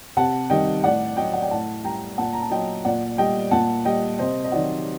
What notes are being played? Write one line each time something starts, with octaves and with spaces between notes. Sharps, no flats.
C3 F#5 A5
D#3 G3 D#5 G5
A2 D5 F#5
F#3 D#5 G5
F#5
G5
A2 F#5 A5
G3 G5 A#5
A#2 F#5 A5
A#5
A5
F#3 D#5 G5
A#2 D5 F#5
G3 D#5 G5
A#2 F#5 A5
G3 D#5 G5
C3 C5 D#5
D#5
D#3 F#3 D5 F#5